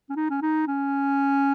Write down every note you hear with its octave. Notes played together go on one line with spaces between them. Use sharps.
C#4
D#4
C#4
D#4
C#4